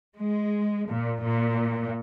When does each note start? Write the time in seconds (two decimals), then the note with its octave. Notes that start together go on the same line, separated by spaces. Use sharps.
0.17 G#3
0.89 A#2
1.24 A#2